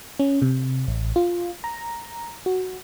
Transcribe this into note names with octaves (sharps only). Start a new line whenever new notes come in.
C#4
C3
A1
F4
A#5
F#4